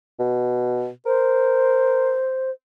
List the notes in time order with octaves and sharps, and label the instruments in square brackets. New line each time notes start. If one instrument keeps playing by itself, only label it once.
[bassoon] B2
[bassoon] A#4 [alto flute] C5